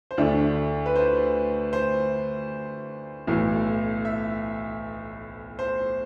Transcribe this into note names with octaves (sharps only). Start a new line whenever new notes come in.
C5
D2 D3 A3 D5
B4
C5
C5
B1 A2 E3
E5
C5